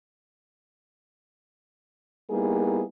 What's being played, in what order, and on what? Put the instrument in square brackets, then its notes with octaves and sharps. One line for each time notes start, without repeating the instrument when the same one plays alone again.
[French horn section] G3 A#3 B3 D#4 E4 G#4